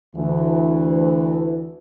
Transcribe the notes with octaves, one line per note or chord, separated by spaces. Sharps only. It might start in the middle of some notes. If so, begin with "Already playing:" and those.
D2 E3